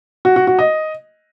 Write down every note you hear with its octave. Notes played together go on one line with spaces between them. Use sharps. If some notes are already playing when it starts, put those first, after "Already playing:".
F#4
F#4
F#4
D#5